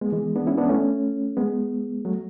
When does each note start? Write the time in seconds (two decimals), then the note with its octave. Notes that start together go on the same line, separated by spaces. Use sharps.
0.01 G#3 B3
0.12 E3 G#3
0.36 B3 D4
0.47 C#4 E4
0.58 B3 D4
0.69 A3 C#4
1.37 G#3 B3
2.05 F#3 A3